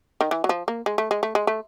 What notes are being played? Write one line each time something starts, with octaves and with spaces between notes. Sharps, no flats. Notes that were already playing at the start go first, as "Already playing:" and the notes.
D#3
E3
F#3
F3
A#3
G#3
A3
G#3
A3
G#3
A3